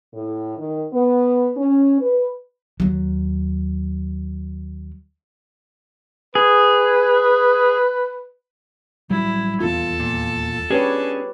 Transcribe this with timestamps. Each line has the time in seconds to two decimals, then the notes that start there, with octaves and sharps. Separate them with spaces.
0.14 A2
0.58 D#3
0.92 B3
1.56 C#4
2.01 B4
2.80 D#2 F#3
6.35 G#4 B4
9.10 A1 F#3 G3 E4
9.61 D#1 E2 B3 F4 A4 A5
10.00 A#2
10.70 C#4 D4 G4 G#4 B4 C#5